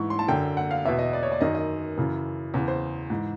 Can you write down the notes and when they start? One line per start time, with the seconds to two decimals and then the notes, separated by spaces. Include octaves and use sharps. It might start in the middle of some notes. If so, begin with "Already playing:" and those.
Already playing: G#2 E3 C#6
0.10 C6
0.19 A5
0.28 F#2 D3 G5
0.57 F#5
0.71 F5
0.85 E2 B2 E5
0.99 D#5
1.13 D5
1.23 C#5
1.32 D5
1.41 F#2 D#3 D#5
1.55 D#5
1.97 F#2 C#3 E3
2.54 E2 C#3 E3
2.68 C5
3.10 G#2 E3